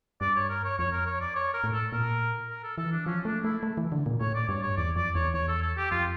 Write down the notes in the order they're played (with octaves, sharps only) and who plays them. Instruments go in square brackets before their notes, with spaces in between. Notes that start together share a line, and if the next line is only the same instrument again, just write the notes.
[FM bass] G2 [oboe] D5
[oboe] C#5
A#4
C#5
[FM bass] F2 [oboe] C#5
[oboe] A#4
C#5
D5
C#5
A#4
[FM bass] A2
[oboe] A4
[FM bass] A#2 [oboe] A#4
[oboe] A#4
A4
[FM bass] E3 [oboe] A4
[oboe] D4
[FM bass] F3 [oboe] C#4
[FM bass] A3 [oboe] D4
[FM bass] A3 [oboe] E4
[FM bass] A3
E3
D3
A#2
[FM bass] A2 [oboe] C#5
[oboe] D5
[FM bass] G2 [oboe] C#5
[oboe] C#5
[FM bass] E2 [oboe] D5
[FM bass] F2 [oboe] D5
[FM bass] E2 [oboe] C#5
[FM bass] E2 [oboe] C#5
[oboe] A4
A4
G4
[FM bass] F2 [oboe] F4